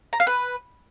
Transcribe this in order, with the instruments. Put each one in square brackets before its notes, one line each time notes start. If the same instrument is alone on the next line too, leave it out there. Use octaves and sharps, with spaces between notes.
[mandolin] A#5
F5
B4